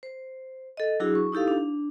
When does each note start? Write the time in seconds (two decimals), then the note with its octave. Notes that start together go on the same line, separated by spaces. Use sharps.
0.03 C5
0.77 A4 D#5
1.00 F#3 D4 E4 F#4 G#4
1.15 C#6
1.32 D#4 E4 G4 A4 F5
1.48 D4